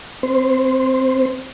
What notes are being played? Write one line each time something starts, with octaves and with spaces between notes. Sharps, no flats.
C4 C5